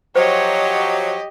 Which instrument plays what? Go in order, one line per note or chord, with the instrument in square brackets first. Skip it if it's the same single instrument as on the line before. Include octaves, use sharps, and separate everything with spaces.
[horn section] F3 F#3 [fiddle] G4 D#5 [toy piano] C5 [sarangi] C#5